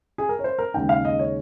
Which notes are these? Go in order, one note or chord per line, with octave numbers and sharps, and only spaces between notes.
G#4
A#4
C#5
C5
A#4
D#2 C#3 G#3 D#4 G5
F5
D#5
C#5